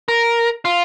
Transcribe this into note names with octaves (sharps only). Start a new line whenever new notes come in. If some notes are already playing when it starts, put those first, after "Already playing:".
A#4
F4